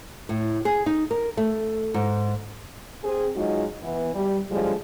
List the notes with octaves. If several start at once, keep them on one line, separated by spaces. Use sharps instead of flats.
A2
G#4
D#4
A#4
A3
G#2
C4 G#4
F#3 G#3 D#4 F4 F#4
E3 B3
G3
A2 D3 F3 G3 G#3